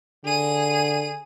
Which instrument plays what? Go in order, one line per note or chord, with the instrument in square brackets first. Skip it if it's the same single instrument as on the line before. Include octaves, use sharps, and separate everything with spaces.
[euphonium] D3 [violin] G#4 D#7